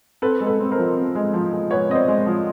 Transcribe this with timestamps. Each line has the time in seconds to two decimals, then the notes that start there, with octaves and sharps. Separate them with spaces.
0.22 C4 A4 B4
0.40 G#3
0.47 A4 B4
0.59 C4
0.71 A#4 C5
0.78 F3
0.97 C4
1.15 G#3
1.34 F3
1.52 G#3
1.71 G#3 B4 C#5
1.89 C4 D#5
1.95 C5 D5
2.08 G#3
2.26 F3